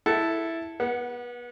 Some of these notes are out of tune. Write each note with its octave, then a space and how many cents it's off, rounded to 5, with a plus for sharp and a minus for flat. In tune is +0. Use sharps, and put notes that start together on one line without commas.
E4 +0 A4 +0 F#5 +20
B3 -30 F#5 +0